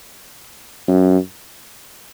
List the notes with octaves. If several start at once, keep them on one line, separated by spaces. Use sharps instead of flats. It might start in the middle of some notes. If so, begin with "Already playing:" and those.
F#2